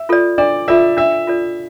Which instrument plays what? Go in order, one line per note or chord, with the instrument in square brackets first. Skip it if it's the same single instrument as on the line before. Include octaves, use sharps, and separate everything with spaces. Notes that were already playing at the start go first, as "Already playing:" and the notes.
Already playing: [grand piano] E5
[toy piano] F4 A4 D5
[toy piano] D4 [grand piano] D5
[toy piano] F4 A4 D5 [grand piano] E5
[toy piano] D4 [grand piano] E5
[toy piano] F4 A4 D5